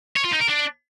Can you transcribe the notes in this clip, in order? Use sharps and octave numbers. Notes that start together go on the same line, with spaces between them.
C#5
F4
D#4
A#4
D4